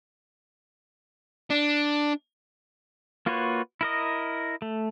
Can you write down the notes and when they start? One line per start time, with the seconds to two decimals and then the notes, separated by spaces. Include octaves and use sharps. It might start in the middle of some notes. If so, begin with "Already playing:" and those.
1.50 D4
3.26 A#3 F4 F#4 B4 C#5
3.81 E4 A#4 D#5
4.62 A3